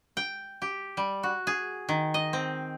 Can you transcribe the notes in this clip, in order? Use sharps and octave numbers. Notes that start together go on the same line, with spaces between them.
G5
G4
G3
F#4
G#4
D#3
D#5
C4